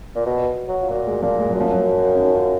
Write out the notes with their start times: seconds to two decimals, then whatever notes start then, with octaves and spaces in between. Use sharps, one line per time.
0.16 A#2
0.26 B2
0.69 F#3
0.83 F4
0.90 A#2 F#4
1.07 G#3
1.22 A#2 F3
1.39 G#3
1.50 F#3
1.55 F#2
1.60 F3
1.72 F#3
2.14 C#4
2.20 D#4
2.35 F4